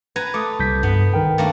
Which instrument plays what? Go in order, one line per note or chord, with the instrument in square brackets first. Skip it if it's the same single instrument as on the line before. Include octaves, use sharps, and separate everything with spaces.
[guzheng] B4 G#5 A#5
[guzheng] A3 [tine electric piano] D6 D#6
[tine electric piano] C2 G6 B6
[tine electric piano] G2 [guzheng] B3
[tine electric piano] D#3 A#4 G5
[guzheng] A3 A#3 D4